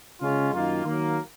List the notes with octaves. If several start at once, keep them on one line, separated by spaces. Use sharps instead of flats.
C#3 G#3 C#4 F4
F#2 D#3 A#3 F4
D#3 F#3 A#3